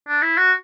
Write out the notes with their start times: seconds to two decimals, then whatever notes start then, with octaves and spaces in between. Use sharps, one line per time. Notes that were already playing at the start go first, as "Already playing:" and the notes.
0.08 D4
0.22 E4
0.37 F#4